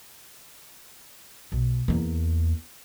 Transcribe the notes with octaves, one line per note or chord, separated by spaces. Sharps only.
B1
E2 A#3